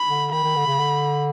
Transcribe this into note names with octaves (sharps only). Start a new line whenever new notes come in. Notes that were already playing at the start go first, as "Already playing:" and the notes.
Already playing: B5
D3
D#3 B5
D#3
D3
C#3
D3